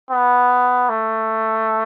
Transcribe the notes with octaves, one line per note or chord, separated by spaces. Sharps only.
B3
A3